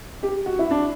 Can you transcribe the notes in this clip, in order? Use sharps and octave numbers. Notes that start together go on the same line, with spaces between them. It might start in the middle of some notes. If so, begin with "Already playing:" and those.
G4
F#4
E4
D4